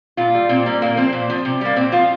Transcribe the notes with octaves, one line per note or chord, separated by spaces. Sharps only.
A#2 F4
G3
A#2 C4
G3 A#3
A#2 A#3
F3 C4
A#2
F3
C3
G3 A#3
A#2 C4
F3 F4